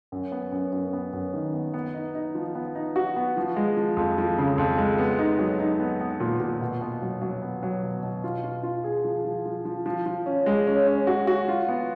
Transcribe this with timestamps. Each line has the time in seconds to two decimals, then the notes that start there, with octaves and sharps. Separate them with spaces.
0.12 F#2
0.32 B3
0.52 F#2
0.73 F#2
0.93 B3
1.13 F#2
1.34 D#3
1.54 B3
1.74 B3
1.94 D#4
2.15 D#4
2.35 F3
2.55 B3
2.75 D#4
2.96 F#4
3.16 B3
3.37 F3
3.56 G#3
3.77 F3
3.97 F2
4.18 F3
4.38 C#3
4.58 F2
4.78 G#3
4.98 B3
5.19 D#4
5.39 F#3
5.59 D#4
5.80 B3
6.00 B3
6.20 A#2
6.40 A#2
6.61 B2
6.81 B3
7.02 F#3
7.22 F#3
7.42 B3
7.63 F#3
7.83 B2
8.03 B2
8.24 F4
8.44 F4
8.63 F4
8.84 G#4
9.05 F3
9.25 F3
9.46 F3
9.65 F3
9.86 F3
10.06 F3
10.26 C#4
10.46 G#3
10.67 C#4
10.87 C#4
11.07 F#4
11.27 F#4
11.48 F4
11.69 B3